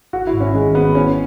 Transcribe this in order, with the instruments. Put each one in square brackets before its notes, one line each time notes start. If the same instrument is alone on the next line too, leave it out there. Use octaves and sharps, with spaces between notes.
[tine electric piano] G#1 [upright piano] F#4
[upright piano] E4
[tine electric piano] G#2
[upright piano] C#4
[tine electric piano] D#3 [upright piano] G#3
[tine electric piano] G#1 [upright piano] B3
[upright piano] C#4 [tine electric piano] E4